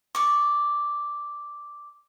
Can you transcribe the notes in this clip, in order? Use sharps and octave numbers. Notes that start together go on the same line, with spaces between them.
D5 C#6